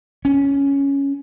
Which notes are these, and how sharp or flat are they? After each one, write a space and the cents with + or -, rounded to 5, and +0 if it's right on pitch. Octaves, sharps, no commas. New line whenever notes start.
C#4 +5